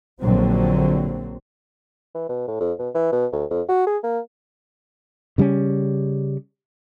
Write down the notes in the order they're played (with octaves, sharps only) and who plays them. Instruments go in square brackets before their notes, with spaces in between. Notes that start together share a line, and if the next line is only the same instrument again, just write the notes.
[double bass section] A#1 D3 F#3 C4
[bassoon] E3
B2
A2
F2
B2
E3
B2
D2
F2
F#4
G#4
A#3
[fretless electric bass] C#3 G3 A3 C#4